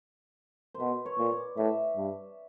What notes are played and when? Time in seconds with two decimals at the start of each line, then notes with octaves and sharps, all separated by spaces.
0.74 C5
0.80 B2 B4
1.06 C#5
1.18 A#2
1.32 D5
1.57 A2 E5
1.96 G2